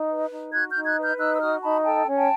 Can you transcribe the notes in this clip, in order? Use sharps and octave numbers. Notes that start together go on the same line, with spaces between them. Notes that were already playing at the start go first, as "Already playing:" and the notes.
Already playing: D#4
B4
D#4
F#4 F#6 G#6
F6 G6
D#4
F#6 G#6
B4
F6 G6
D#4 E6 F#6
E6
F#4 D#6 F6
D#4 A5 B5
A4 G5 A5
C#4
G5 A5